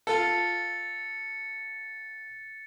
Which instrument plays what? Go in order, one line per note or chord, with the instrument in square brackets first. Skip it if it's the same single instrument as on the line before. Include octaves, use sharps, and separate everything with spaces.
[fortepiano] F4 A4 [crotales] A6 C#7